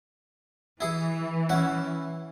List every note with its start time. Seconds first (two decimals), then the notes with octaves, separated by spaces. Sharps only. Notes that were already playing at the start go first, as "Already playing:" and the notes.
0.81 E3 E4 G#4 C#6
1.49 C#4 E4 F#5